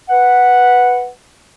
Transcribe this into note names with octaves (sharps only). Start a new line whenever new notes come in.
B4 F#5